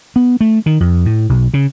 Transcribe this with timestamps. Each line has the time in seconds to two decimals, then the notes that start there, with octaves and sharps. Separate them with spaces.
0.16 B3
0.41 A3
0.66 D#3
0.80 F2
1.06 A2
1.29 B1
1.54 C#3